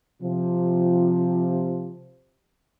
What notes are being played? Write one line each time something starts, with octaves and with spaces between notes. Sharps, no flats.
C3 F3